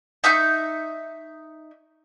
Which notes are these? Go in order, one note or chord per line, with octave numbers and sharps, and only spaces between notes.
D#4 E5 C#6 G6